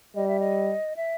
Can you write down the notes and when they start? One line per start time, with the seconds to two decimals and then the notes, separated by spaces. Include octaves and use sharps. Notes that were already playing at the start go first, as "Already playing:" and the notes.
0.15 G3 D#5
0.28 E5
0.40 D#5
0.96 E5